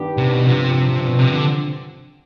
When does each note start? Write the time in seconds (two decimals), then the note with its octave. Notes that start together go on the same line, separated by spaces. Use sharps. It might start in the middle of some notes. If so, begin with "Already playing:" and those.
Already playing: G2 D#3 B3 D4 G4
0.17 C3
0.31 B2
0.46 G2 C3 F3 C4
0.74 C3
0.88 C3
1.07 B2
1.19 C3
1.31 D3